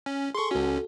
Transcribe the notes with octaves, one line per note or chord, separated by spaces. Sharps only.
C#4
G#4 A4 C6 C#6
C#2 C#4 F#4 A4